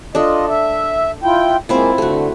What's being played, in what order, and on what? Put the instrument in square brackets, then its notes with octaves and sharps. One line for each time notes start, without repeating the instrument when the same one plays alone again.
[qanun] D4 A4 [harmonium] F4 D#5
[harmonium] E5
E4 F4 G5
[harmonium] G#3 A#3 [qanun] C4 E4 F4
[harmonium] D3 [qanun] A3 F#4